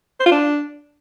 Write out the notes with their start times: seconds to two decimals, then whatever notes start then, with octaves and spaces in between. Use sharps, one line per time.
0.20 C5
0.26 F4
0.32 D4